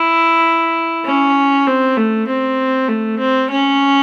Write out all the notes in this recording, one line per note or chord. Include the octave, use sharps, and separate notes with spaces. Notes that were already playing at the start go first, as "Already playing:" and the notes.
Already playing: E4
C#4
C4
A3
C4
A3
C4
C#4